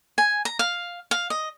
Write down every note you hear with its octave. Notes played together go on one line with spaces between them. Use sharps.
G#5
A#5
F5
F5
D#5